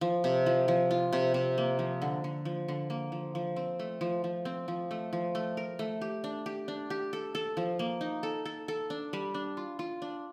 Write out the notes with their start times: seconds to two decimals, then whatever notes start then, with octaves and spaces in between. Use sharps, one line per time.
0.01 F3
0.24 C3
0.46 F3
0.68 F3
0.91 F4
1.13 C3
1.34 C3
1.58 A#3
1.79 F3
2.02 D3
2.24 D3
2.45 F3
2.68 D3
2.90 A#3
3.12 F3
3.35 F3
3.56 C4
3.79 A3
4.01 F3
4.24 F3
4.45 C4
4.68 F3
4.91 A3
5.13 F3
5.35 A3
5.57 A#4
5.79 A3
6.01 G4
6.24 D4
6.46 G4
6.68 D4
6.90 G4
7.13 A4
7.35 A4
7.57 F3
7.79 A#3
8.01 D#4
8.23 A4
8.45 A4
8.68 A4
8.90 D4
9.13 G3
9.34 D4
9.57 F4
9.79 F4
10.02 D4